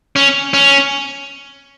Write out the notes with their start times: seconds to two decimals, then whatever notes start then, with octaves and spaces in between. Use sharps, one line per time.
0.16 C#4
0.54 C#4